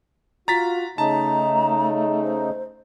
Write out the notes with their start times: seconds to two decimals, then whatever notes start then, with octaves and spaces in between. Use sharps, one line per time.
0.48 F4 F#4 A#5 A6 B6
0.98 C#3 A3 D#4 A5 A#5
2.23 C5